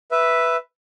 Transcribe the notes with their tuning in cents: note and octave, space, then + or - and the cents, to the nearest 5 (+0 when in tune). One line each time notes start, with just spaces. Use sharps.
B4 +0 E5 +0